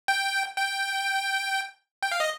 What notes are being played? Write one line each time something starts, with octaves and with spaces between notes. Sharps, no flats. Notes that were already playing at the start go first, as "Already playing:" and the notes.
G5
G5
G5
F5
D#5